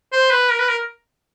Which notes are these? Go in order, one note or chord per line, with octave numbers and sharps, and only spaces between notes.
C5
B4
A#4
B4
A#4